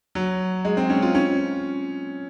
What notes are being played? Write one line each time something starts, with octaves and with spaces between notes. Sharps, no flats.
F#3
G#3
C4
C#4
F4
C#4